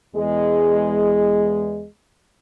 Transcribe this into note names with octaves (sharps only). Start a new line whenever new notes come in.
E2 G#3